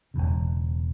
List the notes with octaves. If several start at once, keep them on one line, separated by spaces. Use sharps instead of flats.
E1 E2 C#3